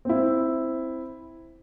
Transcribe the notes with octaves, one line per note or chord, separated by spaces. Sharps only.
C4 E4